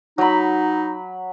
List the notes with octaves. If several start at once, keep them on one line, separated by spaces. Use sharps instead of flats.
F#3 D#4 B5